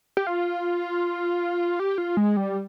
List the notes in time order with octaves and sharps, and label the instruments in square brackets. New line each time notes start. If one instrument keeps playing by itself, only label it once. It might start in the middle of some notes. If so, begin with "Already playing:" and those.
[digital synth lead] G4
F4
G4
F4
G#3
G3